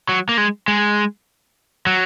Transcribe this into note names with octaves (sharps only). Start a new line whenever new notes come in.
F#3
A#3
G#3
G#3
F#3